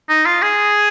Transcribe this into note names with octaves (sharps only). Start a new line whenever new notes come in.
D#4
F4
G#4